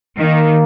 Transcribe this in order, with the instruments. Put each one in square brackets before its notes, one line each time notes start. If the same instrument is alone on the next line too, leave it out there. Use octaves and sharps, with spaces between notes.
[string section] D#3 [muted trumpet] A#3